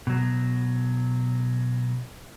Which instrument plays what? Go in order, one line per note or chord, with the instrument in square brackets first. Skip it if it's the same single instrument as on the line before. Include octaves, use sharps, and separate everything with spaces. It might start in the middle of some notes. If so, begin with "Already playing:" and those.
[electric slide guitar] B2 F#3